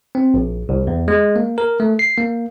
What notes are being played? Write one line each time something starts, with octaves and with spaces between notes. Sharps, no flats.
C4
A#1
C2
E2
G#3
A#3
A#4
A3
C7
A#3